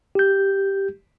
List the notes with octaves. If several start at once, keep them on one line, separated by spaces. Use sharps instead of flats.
G4 G6